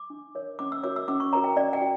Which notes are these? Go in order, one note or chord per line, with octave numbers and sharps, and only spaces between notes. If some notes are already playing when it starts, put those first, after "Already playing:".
Already playing: D6
D4
A#4 C#5
C#4 D6
E6
F#4 A#4 C#5 D6
E6
C#4 D6
C#6
F#4 A#4 C#5 A#5
G5
C#4 D5
G5
F#4